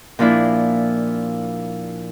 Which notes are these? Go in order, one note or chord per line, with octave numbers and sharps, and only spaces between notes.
A#2 F3 D4 E4